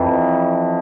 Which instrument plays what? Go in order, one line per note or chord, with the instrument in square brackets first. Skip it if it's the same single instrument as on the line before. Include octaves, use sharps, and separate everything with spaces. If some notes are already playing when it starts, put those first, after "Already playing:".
Already playing: [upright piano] F2 [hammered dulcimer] E3 F#3